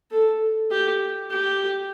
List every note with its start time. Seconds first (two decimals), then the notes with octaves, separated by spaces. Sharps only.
0.11 A4
0.71 G4
1.31 G4